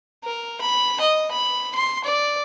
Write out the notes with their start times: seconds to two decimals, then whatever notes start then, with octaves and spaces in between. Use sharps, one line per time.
0.24 A#4
0.61 B5
1.01 D#5
1.31 B5
1.75 C6
2.04 D5